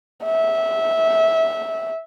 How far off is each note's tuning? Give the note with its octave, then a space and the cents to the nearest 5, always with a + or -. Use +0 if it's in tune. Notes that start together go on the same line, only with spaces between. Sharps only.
E5 -15